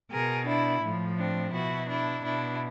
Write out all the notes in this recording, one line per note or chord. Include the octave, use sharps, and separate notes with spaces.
B2 G#4 A#4
D4 E4
A2 F3
C4 D4
B2 E4 F#4
D4 E4
B2 D4 E4